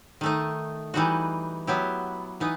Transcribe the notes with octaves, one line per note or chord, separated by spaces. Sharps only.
D#3 A3 D#4
E3 G3 D#4 F#4
F#3 B3 E4 G4
E3 B3 D#4